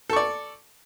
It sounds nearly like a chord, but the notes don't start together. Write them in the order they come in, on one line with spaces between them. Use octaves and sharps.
A4 C#6 D5